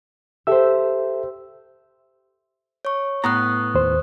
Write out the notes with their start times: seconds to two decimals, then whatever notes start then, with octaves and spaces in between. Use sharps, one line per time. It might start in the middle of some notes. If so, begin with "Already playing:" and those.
0.47 G4 A4 C5 E5 E6
2.85 C#5 C#6
3.24 A2 B3 A#5 C#6 D#6 F#6
3.74 D#2 C5